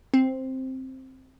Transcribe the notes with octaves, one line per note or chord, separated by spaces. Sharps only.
C4